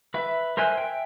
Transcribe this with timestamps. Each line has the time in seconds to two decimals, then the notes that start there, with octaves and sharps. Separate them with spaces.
0.14 B4 E5
0.57 A#4 C5 E5 G#5 F#6
0.78 E5 G5